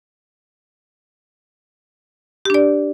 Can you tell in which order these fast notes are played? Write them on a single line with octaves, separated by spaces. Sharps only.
G4 D4 D5